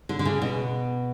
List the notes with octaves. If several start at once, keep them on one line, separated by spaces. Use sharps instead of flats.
D3
D3
C#3
B2